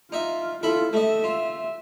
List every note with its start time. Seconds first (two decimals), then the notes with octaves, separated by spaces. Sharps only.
0.12 D#4 F4 E5
0.63 E4 F4 A4 E5 B5
0.93 A3 D#5 E5
1.24 F4